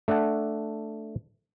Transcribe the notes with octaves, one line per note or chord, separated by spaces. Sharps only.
A3 D4 A4 F#5 A5